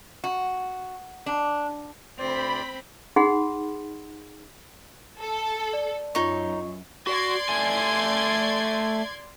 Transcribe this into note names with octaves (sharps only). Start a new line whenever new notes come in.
F#4
D4
D2 C4 C5 D5 B5
D#4 G#4 F#5 B5 C6
A4
D5
F#2 D#4 F4 C#5 D#5 C#6
F#4 D5 C6 G#6
A3 G#5